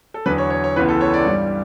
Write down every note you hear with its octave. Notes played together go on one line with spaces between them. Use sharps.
A4
E2 D3 F#3 B4
C#5
C#5
C#5
C#2 C#3 E3 B3 B4
A4
C#5
D5
G2 E3 G3